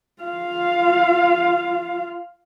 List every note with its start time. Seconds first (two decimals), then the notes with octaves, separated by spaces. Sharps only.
0.23 F4 F5